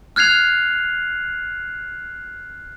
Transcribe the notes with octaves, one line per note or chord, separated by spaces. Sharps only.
F6 F#6 G#6 C7 F7